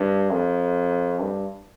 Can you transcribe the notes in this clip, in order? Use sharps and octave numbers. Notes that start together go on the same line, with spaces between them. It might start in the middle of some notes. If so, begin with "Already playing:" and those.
Already playing: G2
F2
G2